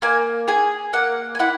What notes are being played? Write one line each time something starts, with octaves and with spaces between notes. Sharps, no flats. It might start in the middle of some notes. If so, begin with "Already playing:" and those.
A#3 G#5
G#4 G#5
A#3 F#5
G#5
E4 F#5